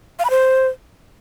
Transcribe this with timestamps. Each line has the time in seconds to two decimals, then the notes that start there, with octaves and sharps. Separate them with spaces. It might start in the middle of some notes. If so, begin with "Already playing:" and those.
0.19 F5
0.25 B5
0.30 C5